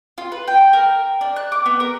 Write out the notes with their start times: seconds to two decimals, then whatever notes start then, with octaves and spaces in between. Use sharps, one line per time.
0.18 F4
0.32 B4
0.48 G5
0.73 A#4
1.21 D4
1.36 F#6
1.52 D6
1.66 B3
1.80 A#4